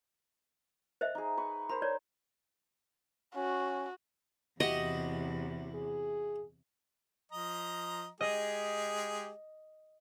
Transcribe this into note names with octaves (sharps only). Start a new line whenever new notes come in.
C5 D#5 E5
D#4 G#4
B4 C#6
A#4 C5 B5
C#5 D5
C#4 F#4
E2 C3 E4 F#4 G4 D#5
G#4
F3 D#5 A#5
G#3 G4 G#4 D#5